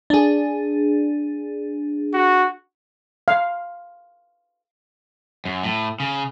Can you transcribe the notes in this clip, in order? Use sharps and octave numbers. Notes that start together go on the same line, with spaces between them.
D4 G#4
F#4
F5
F#2
A2
C#3